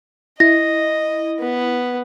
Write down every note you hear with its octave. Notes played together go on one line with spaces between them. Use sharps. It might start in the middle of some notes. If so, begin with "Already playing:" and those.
E4 D#5 A#6
B3